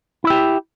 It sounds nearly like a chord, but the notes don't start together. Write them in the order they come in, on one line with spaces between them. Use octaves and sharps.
E4 E5 G4